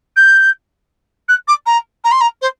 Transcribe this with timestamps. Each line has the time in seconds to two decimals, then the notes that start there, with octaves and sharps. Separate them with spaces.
0.16 G6
1.29 F#6
1.48 D6
1.66 A#5
2.04 A#5
2.11 C6
2.21 A#5
2.42 C5